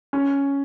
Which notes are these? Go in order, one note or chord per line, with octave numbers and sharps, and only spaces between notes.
C#4